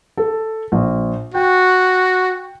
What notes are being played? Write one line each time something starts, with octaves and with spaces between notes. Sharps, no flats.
A4
A#1
F#4 G5